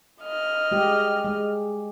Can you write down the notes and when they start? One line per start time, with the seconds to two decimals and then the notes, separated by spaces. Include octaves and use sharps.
0.21 D#5 F6
0.71 G#3 G4
1.24 G#3